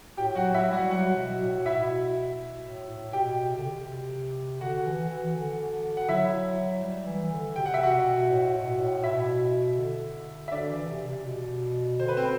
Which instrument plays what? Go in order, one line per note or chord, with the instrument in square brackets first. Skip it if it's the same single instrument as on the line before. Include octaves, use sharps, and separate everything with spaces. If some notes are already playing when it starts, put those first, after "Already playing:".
[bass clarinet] A2 [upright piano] G4 G5
[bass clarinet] F#3 [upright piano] F#4 F#5
[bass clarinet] F#3 [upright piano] E4 E5
[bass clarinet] G3 [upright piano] F#4 F#5
[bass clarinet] F#3 [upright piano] F#4 F#5
[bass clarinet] B2
A2
[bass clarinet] B2 [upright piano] E4 E5
[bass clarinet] A2
A2
[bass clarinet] B2 [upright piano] G4 G5
[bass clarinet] C3
D3
C3
[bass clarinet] D3 [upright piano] F#4 F#5
[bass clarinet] E3
E3
D3
[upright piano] F#5
[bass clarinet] F#3 [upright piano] E4 E5
[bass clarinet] G3
E3
D3
[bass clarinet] C3 [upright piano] G5
[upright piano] F#5
E5
F#4 F#5
[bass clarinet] B2
A2
B2
A2
[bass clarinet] B2 [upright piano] E4 E5
[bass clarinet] D3
[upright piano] E5
[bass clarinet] D3 [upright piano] D4 D5
[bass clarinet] E3
C3
C3
B2
[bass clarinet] D3 [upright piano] C5
[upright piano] B4
C4 C5